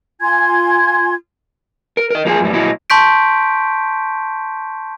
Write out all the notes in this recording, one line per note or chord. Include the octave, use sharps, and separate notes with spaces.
F4 G#5 C6 G#6
A#4
A#4 D#5
F2 A#3 F4 F#4 G#4
F#2 A2 G3
A#2 F#3 E4 D#5
A5 C6 C#6 G6 B6 D7